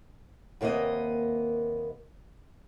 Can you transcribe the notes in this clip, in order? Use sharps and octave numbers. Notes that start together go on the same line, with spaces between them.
D#2 C3 A#3 B3 D#5